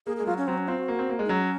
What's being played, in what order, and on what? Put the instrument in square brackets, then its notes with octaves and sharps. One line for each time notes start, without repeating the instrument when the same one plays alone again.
[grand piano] A#3 [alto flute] G#4
[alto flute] G#4
[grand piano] G#3
[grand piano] F#3 [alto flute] F4
[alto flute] C#4
[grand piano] F#3 [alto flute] C4
[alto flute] C#4
[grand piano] C4 [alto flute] F4
[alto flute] F#4
[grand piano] A#3
C4
A#3
G#3
[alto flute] D#4
[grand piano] F#3 [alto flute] C#4